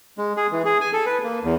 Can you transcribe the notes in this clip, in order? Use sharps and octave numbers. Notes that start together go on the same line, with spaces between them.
G#3
G#4
E3
G#4
G#5
A4
B4
A#3
E2